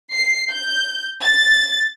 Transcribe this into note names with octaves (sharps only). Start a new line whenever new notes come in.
C7
G6
A6